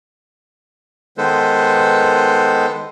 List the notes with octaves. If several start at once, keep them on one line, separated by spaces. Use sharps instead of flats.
D#3 G#3 B3 A4 B4 C5